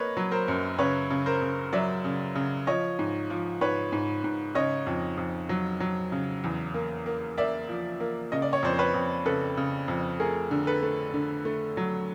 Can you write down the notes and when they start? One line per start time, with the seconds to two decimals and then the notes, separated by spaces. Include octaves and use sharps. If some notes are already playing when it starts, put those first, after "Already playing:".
Already playing: A#3 B4 C#5 D#5
0.17 F#3
0.31 A#4 C5
0.48 F#2
0.78 C#3 B4 C#5
1.10 C#3
1.26 A#4 C5
1.42 C#3
1.73 F#3 D5 E5
2.04 C#3
2.35 C#3
2.67 F3 C#5 D#5
2.99 G#2
3.30 F3
3.61 G#2 B4 C#5
3.92 G#2
4.24 G#2
4.55 C#3 C#5 D#5
4.87 F2
5.18 F2
5.49 F#3
5.80 F#3
6.12 C#3
6.44 E2
6.74 A#3
7.06 A#3
7.38 A#3 D5 E5
7.69 F3
8.00 A#3
8.32 C#3 D#5
8.42 D5
8.53 C#5
8.63 F2 C5 D5
8.74 C5
8.79 B4 C#5
8.94 F2
9.25 C#3 A4 B4
9.57 C#3
9.88 F2
10.20 A3 G#4 A#4
10.51 D3
10.67 A4 B4
10.83 A3
11.14 D3
11.45 A3
11.77 F#3